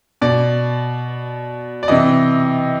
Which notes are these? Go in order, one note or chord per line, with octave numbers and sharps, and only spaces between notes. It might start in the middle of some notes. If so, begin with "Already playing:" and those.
B2 D5
D5
C3 E3 D#5